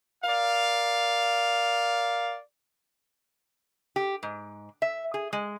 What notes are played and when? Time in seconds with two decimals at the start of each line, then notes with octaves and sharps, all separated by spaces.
0.25 A#4 D5 F5
3.96 G4
4.23 G#2
4.82 E5
5.14 G#4
5.33 G#3